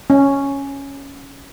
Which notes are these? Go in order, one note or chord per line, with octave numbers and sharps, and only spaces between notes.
C#4